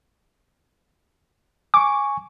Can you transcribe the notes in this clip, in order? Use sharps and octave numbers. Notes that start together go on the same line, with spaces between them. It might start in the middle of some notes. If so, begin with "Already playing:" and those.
G#5 C#6 D6